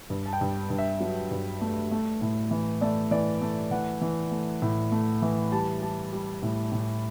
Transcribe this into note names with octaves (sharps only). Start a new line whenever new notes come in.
G2
A5
G5
G2
G2
E5
F#3
G2
A3
A3
A2
E3
A3 D5
E3 D5
A3
E3 F#5
E3
A3
A2
A3
E3
G3 A5
G3 A5
G3
A2
A2